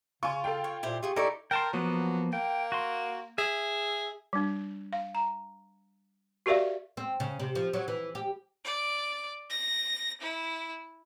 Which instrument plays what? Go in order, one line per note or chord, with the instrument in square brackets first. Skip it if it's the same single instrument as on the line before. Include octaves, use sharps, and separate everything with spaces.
[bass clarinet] C#3 [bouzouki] F4 [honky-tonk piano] G#5 C#6
[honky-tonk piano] A4 F5 G5
[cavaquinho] C#5
[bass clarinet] A#2 [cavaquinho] E4 G4 C5
[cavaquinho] F4 G#4 C#6 [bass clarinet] G4
[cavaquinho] D#4 C#6 [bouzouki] E4 D5 [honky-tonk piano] A4
[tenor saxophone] A#4 [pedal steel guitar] G5 A5 C6
[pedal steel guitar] F3 A#3 B3 [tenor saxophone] F#3
[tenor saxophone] A#3 [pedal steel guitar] G5
[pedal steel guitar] F#4 C6
[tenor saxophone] G#4 [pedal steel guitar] E5
[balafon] G3 D4
F5
A#5
F#4 G4 A#4 D5 E5 F5
[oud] C4
C#3
C3
F3
F#3
E3
G4
[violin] D5
A#6
E4